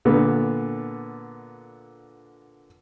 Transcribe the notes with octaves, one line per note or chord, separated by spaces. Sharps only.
A#2 D3 B3